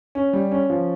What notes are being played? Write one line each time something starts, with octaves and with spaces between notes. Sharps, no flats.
C#4
G3
C#4
F3